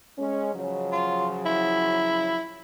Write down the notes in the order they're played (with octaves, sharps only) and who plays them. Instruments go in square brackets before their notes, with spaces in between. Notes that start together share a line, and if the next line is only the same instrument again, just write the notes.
[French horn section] G#3 C#4
C#3 F3 F#3
[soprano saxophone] F4
E4